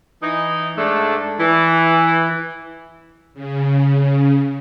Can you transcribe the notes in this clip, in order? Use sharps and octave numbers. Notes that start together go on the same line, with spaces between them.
E3 D#4
G#2 A3 D4
E3
C#3